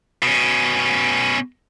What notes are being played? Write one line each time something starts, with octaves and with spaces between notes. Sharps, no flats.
B2 C#4